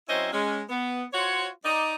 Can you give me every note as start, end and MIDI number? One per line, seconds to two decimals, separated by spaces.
0.08 0.28 54
0.08 0.28 60
0.08 0.28 61
0.08 0.28 64
0.08 0.28 72
0.08 0.28 75
0.33 0.61 56
0.33 0.61 61
0.70 1.03 59
1.13 1.48 65
1.13 1.48 66
1.13 1.48 72
1.13 1.48 73
1.64 1.95 63
1.64 1.95 74